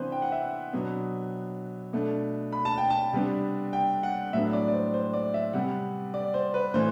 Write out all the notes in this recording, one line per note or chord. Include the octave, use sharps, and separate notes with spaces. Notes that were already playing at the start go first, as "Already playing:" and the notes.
Already playing: C3 E3 B3 D4 B4 C5
G5
F#5
E5
F#5
B2 F#3 B3 D4
B2 A3 D4
B5
A5
G5
A5
C3 G3 B3 D4
G5
F#5
A2 F#3 B3 D4 E5
D5
D5
C5
C5
D5
E5
C3 G3 B3 F#5
D5
C5
B4
A2 E3 C5